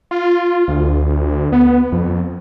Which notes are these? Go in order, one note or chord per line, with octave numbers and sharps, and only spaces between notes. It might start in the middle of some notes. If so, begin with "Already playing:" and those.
F4
D2
B3
F2